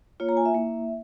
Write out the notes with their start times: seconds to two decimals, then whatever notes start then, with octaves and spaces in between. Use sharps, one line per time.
0.20 A#3 F4 C#5
0.29 A#5
0.37 G#5
0.46 E5
0.54 A#3 E4